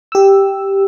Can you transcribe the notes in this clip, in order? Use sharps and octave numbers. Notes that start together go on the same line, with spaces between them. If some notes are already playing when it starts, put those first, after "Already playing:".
G4 E6